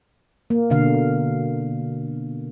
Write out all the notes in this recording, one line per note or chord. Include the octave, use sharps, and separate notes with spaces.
A#3
B2 D3 F5